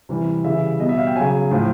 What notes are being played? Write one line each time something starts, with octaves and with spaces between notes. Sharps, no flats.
C3 E3 G3
C#3 E3 G3 E5
B2 G3 D#5
E5
F5
G5
C#3 F#3 G#5
A2 F3